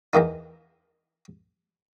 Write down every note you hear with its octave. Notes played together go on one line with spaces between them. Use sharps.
E2 E3 A#3 D#4